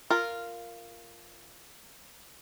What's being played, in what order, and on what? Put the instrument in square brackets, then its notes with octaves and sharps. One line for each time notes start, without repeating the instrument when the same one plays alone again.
[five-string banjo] F4 A#4